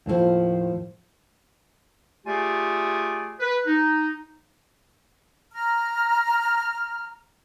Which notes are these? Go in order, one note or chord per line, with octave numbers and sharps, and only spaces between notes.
D#2 A2 D3 F3
A3 F4 G4 G#4 D5 G#5
B4
D#4
A#5 F6